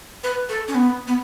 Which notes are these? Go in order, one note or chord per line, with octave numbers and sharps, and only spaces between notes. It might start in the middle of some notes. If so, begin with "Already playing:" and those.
B4
A4
C#4
B3
B3